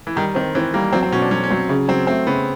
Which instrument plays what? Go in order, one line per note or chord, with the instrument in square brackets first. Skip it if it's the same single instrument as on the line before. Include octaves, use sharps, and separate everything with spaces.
[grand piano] E3
[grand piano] D#3 [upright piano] G3
[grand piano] D#3 [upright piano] C4
[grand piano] E3 [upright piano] C4
[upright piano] G3 [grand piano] A#3
[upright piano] F#3 [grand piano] C4
[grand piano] C4
[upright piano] B2 [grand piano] C#4
[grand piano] D4
[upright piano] F#3 [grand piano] C#4
[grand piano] C#4
[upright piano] F#3 [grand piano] C4
[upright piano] C#3
[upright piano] F#3 [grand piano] C4
[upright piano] A3 [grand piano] C4
[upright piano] C#3 [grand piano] B3